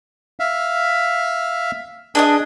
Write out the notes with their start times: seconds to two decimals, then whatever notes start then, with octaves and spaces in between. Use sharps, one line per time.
0.40 E5 F5
2.15 D4 G#4 D5 D#5